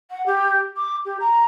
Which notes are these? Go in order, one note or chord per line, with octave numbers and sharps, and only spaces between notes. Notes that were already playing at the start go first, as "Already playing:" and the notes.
F#5
G4
D6
G4
A#5